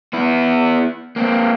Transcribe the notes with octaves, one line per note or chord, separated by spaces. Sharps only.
B3 E4
A#3 C4